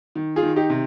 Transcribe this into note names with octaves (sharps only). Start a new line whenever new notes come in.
D#3
F4 G#4
D#3
D#4 G4
C3